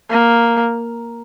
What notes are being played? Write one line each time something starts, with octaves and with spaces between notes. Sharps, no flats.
A#3